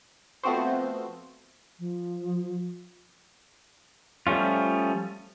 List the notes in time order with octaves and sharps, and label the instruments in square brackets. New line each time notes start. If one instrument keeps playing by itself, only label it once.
[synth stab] F3 A3 B3 C4 F#4 C5
[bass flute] F3
[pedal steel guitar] F3 G3 A3 C#4 F4